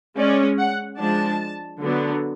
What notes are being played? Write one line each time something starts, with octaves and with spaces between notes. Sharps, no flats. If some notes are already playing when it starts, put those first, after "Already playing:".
G#3 C#4 D5
F#5
F3 G#3 D4 A5
D3 F#3 B3 D4